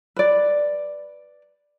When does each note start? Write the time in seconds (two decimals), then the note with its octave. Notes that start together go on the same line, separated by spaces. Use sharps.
0.16 B4 D5